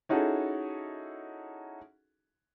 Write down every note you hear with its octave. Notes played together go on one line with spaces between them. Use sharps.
C#4 D#4 E4 F#4 G#4 A4